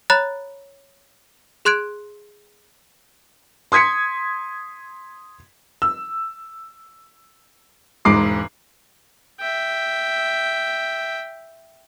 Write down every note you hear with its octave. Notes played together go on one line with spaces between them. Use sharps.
C#5 A#5 B5 F#6 A6
G#4 C6 F#6 G#6 D7
C6 D#6 G#6 B6 C#7
E6
E1 G#2 G#3 D6 C7
E5 G5